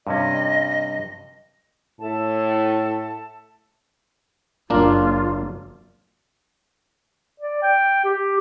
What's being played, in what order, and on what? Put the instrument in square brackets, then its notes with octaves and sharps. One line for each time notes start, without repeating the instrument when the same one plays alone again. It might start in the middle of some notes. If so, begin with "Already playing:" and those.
[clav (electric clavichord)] G2 C3 C#4 [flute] D#5
[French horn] A2 [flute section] A4 E5 A5
[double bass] F#1 [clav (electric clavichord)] A#3 D4 A#4 [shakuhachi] F4
[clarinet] D5
G5
G4